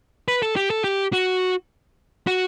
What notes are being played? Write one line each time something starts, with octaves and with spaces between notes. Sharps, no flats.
B4
A4
G4
A4
G4
F#4
F#4